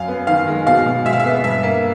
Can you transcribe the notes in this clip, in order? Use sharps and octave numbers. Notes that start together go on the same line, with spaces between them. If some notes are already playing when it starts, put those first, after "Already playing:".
Already playing: F#2 F5
B3
D#3 F5
G#3
B2 F5
B2
G#3 E5
F5
E5
B3
G2 E5
A#3